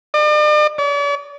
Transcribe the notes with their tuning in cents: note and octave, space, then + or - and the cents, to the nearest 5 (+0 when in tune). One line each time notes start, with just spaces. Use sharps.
D5 +45
D5 -45